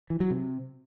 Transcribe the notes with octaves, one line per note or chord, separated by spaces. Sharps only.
E3
F#3
C3